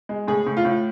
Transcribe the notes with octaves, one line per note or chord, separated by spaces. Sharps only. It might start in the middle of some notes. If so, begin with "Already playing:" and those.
G#3
A2 G#4
A2
F4
A2